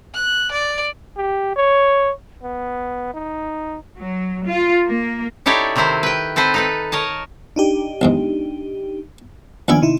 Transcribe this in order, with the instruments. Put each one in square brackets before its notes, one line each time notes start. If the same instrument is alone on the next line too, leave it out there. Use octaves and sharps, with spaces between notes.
[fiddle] F#6
D5
[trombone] G4
C#5
B3
D#4
[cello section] F#3
F4
A#3
[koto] D#4 E4 G4 A4 C#5 D5
C3 D#3 C4 E4 C5
B4 G5
C4 A4 B4 C5
D#4 A4 B4
A#4 C#5 D#5 A5
[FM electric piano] D4 D#4 G4
[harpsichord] B1 E2 G#2
[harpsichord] D#2 B3 E5 [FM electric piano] F3 D4 G#5
[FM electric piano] C3 D#4 E4